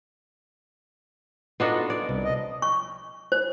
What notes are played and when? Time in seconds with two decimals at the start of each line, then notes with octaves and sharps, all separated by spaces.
1.60 B3 D4 D#4 F4 F#4 A4 B4 D#5
1.90 D5
2.09 C2
2.24 D#5
2.62 C#6
3.32 C5